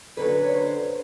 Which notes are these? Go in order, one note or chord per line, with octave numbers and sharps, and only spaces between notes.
F#2 D3 F#3 B4
C#5
C5